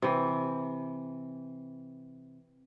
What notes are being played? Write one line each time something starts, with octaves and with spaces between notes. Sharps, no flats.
C3 E3